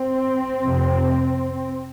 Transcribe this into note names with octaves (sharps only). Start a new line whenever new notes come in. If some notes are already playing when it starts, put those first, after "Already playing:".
Already playing: C4
F2 C3